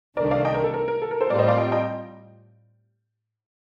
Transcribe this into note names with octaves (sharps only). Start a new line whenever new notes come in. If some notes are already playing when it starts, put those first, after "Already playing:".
C2 C3 D#3 A3 D4 A#4 D5
D5 F5
D#5 G5
A#4
A4
A#4
A#4
A4
A#4
A4 C5
A2 G3 C4 F4 A#4 D5
C5 D#5
D5 F5
D#5 G5
D#5 G5